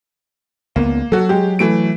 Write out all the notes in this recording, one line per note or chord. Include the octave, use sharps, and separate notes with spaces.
C#2 F#3 A#3 B3
F#3 F#4 A4
G#3 G4
E3 A3 D7